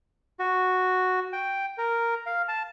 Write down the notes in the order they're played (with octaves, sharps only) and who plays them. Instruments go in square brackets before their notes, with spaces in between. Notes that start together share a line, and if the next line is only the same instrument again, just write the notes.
[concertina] F#4
G5
A#4
F5
A5